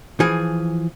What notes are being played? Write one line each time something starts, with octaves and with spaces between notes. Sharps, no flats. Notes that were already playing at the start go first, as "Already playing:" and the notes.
E3 F3 G#4